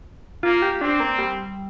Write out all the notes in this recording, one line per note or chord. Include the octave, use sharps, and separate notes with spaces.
A#3 F4
G4
C4 D4
A#3
G3